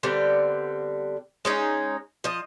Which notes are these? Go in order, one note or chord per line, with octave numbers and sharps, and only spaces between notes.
D3 G3 B3 C4
G#3 C#4 D#4
F3 D#5